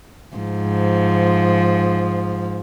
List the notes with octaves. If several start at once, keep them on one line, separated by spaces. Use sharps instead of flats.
G#2 F3